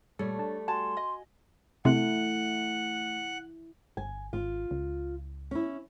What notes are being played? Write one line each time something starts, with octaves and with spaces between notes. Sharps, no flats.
A#2 G3 A3 A4 C#5
D4 A5
F#4 G#5 A5 C6
D#5
C3 A3 E4 F#5
G1 G#5
G#1 F4
C#2
C#4 E4